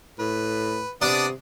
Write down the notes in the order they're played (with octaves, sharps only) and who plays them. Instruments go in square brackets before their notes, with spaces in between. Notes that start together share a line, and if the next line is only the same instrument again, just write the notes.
[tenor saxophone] A2 [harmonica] B4
[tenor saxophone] C3 [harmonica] B3 D5 D#6 [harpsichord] D4